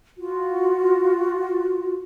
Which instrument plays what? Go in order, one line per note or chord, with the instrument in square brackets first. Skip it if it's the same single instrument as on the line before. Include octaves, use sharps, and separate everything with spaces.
[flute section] F4 F#4